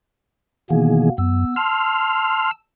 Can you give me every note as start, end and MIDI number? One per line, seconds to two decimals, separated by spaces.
0.70 1.09 47
0.70 1.10 51
0.70 1.10 52
0.70 1.09 58
0.70 1.09 59
0.70 1.10 68
1.18 1.45 42
1.18 1.55 59
1.18 1.55 88
1.56 2.51 81
1.56 2.51 84
1.56 2.51 88
1.56 2.51 89